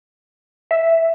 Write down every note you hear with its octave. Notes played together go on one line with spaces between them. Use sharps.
E5